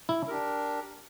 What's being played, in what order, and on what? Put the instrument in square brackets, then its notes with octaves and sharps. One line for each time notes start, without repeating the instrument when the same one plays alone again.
[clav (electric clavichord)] E4
[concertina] D4 G4 A#4